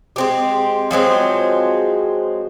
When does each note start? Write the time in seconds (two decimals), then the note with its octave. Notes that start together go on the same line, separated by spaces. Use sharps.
0.16 G#3 C4 G4
0.91 F3 F#3 G#3 C4